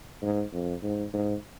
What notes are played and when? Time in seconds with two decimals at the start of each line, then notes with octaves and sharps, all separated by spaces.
0.22 G#2
0.53 F2
0.83 G#2
1.14 G#2